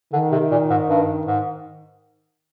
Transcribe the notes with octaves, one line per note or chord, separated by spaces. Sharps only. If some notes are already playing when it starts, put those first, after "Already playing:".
D3 D#3
C3
A#2
G#2
G2
G#2